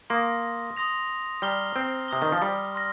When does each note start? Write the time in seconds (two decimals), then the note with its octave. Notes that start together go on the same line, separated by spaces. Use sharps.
0.10 A#3 C6 D#6 A#6
0.77 C6 D#6 A#6 F7
1.42 G3 A#5 F6 C7 G7
1.76 C4
2.08 C3 D#6 A#6 G7
2.22 D#3
2.32 F3
2.42 G3
2.75 C6 F6 A#6